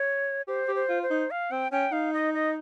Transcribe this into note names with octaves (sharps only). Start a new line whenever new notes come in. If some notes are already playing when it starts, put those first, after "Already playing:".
Already playing: C#5
G4 C5
G4
C5
F4
C5
D#4
F5
C4 G5
C#4 G5
D#4 F5
D#5
D#5